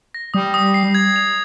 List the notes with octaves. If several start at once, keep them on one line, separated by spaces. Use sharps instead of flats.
A#6
G3 D#6
D#6
C7
G#6
F7